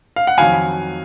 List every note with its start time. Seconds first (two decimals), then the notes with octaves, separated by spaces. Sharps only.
0.16 F5
0.27 F#5
0.38 F2 D#3 F#3 F5 G#5